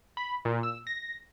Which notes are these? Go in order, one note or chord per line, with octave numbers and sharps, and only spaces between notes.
B5
A#2
E6
A#6